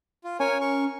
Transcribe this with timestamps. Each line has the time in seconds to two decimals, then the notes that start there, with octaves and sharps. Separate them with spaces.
0.24 F4
0.40 C#4 A#4 C#5 G#5
0.61 A#4 C#6